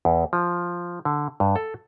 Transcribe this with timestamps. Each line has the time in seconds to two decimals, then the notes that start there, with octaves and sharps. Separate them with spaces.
0.05 E2
0.33 F3
1.05 D3
1.40 G2
1.56 A4